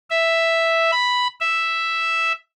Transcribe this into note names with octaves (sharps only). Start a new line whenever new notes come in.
E5
B5
E5